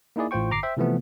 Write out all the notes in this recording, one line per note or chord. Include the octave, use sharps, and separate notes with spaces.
A#3 D#4 E4 G#4 D5
A1 A2 F4 C5 G5 C#6
G1 A#5 D6 C7
C5 E5 G5
C3 E3 F3 A3 B3